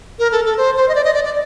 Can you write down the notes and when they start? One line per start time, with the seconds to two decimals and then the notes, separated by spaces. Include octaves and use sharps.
0.19 A#4
0.32 A4
0.45 A4
0.57 C5
0.76 C5
0.88 D#5
0.95 D5
1.04 D#5
1.14 D5
1.24 D5